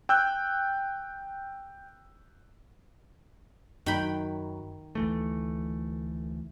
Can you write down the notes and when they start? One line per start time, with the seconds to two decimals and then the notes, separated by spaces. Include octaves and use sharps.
0.09 G5 E6 F#6 G6
3.86 F#2 D#3 F#3 G5 B5
4.95 D2 E3 A3